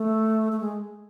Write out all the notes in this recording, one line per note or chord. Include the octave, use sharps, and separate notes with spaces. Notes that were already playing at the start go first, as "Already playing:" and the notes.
Already playing: A3
A3
G#3